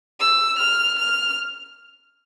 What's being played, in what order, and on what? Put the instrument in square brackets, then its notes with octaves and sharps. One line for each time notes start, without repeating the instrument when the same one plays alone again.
[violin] E6
F6
F6